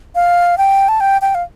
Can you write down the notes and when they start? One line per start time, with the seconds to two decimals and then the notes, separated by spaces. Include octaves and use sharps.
0.15 F5
0.58 G5
0.89 A5
1.00 G5
1.22 G5
1.35 F5